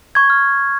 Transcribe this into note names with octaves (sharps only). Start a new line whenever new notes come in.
C#6 G#6
F6